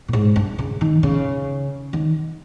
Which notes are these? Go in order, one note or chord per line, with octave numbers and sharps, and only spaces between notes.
A#2
G#2
G2
C#3
D#3
C#3
D#3